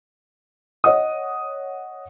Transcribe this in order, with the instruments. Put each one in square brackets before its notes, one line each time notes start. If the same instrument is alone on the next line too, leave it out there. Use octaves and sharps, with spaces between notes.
[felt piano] C#5 D#5 F#5 D#6